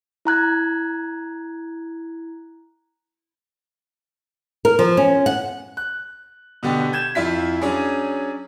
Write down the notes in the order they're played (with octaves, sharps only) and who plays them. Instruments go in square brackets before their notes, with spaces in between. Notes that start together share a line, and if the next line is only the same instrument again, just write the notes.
[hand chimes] E4 A#5 F#6 G#6
[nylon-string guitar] A#4
F3
C#4
F#5
[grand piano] F#6
B2 D3 B3 G4
G6 G#6 E7
F2 E4 F4 B6
F#3 C#4 D4 G#4